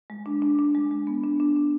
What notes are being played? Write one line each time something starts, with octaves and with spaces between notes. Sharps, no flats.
G#3
D4
D4
D4
G#3
G#3
B3
D4
D4
D4